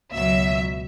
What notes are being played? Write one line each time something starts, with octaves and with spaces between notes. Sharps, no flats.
C#2 B2 F#3 E5